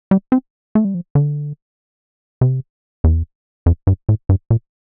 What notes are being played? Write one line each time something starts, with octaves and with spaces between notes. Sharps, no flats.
G3
C4
A3
G3
F3
D3
C3
E2
F2
G2
A2
G2
A#2